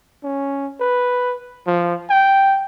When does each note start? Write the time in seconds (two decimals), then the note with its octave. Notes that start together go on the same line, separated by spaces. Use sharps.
0.23 C#4
0.80 B4
1.67 F3
2.10 G5